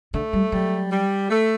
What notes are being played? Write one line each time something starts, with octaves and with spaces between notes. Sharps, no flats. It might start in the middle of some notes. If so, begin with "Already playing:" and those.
D3 A3
G3
F#3 G3
G3
A3